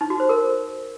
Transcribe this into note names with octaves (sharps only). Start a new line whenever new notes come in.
D#4
F#4
C5
A#4